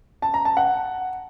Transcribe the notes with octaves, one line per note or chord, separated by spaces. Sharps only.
A5
A#5
A5
F#5